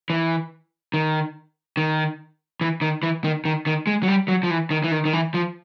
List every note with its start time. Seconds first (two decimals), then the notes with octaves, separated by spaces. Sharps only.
0.10 E3
0.94 D#3
1.77 D#3
2.61 E3
2.81 D#3
3.03 E3
3.24 D#3
3.45 D#3
3.66 D#3
3.87 G#3
4.03 F#3
4.08 G3
4.28 F#3
4.43 F3
4.50 E3
4.71 D#3
4.84 E3
4.91 D#3
5.05 D#3
5.13 E3
5.34 F3